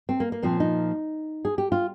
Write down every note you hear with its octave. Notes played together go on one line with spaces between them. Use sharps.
C4
A#3
A#3
A#2 F3 C4
D#4
G#4
G4
F4